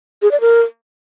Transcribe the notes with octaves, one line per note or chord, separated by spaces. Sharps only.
G#4
D5
A#4